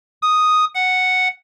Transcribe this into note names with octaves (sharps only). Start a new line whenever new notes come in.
D#6
F#5